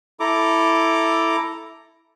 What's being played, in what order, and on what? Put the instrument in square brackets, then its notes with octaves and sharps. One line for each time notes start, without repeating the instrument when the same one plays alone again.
[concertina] E4 A4 A#5 D6